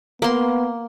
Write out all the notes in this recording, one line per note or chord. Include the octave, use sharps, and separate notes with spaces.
A#3 B3 C6